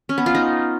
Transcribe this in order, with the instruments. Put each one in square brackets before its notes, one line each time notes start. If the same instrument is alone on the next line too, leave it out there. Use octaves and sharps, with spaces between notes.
[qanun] C#4
B3
F4
D#4